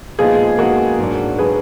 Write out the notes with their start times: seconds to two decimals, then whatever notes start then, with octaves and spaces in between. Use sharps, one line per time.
0.19 A#2 F3 G#3 B3 D#4 F4 G#4
0.58 A#2 F3 G#3 B3 D#4 F#4 A#4
0.98 G#2 F#3 D4
1.38 F#3 D4 G#4 B4